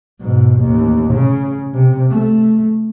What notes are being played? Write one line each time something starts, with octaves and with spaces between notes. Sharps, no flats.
G#2 B2
A1 D#2
C#3
C3
A3